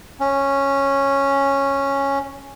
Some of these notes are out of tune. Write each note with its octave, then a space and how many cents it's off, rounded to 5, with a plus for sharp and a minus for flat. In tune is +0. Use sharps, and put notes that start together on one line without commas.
C#4 -5